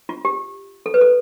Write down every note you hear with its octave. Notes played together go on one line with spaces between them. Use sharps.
F4
G4
A4
B4
A4